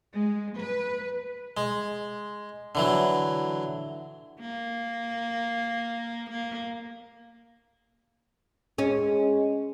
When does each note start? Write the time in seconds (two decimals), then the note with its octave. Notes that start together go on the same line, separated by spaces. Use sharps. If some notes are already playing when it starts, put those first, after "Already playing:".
0.13 G#3
0.58 B4
1.57 G#3
2.75 D3 E3 F#3
4.40 A#3
6.30 A#3
8.78 G#3 C#4